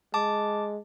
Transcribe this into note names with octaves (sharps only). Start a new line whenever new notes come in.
G#3 A5 D6